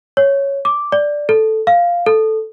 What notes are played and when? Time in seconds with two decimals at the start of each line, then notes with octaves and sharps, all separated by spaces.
0.17 C#5
0.65 D6
0.92 D5
1.29 A4
1.67 F5
2.06 A4